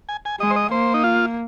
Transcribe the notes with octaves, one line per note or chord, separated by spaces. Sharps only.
G#5
G#5
G#3 D#5
C5
D#5
A#3 C5
D#4
F4